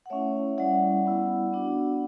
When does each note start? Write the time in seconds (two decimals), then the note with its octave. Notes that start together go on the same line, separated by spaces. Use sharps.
0.06 F#5
0.10 A3 C#4 E4 C#5 E5
0.57 G3 C#4 E4 D5 F#5
1.05 G3 B3 E4
1.53 B3 D4 F#4